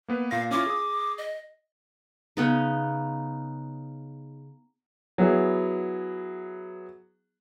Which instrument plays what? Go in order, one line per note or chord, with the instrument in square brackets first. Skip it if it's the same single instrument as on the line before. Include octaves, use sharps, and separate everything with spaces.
[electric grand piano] A#3 B3 B4
[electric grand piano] A#2 A#6 [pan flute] F5
[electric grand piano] C#4 E4 F4 [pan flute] D6
[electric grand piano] G#4 D#6
[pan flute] D#5
[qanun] C#3 B3 D#4
[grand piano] F#3 B3 E4 G#4